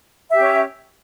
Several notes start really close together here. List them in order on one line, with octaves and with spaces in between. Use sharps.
E5 G4 C#4